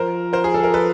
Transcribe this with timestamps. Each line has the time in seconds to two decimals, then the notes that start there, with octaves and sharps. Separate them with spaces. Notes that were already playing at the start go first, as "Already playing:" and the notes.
Already playing: F3 A#4 C5
0.33 A#4 C5
0.44 G#4
0.54 A4
0.63 A#4
0.74 A4 B4